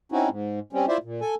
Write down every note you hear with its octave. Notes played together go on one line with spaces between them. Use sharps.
C4 C#4 D#4 E4 F#4
G#2
G3 C4 C#4
E4 F4 C5 D5 E5
A#2
A4 G#5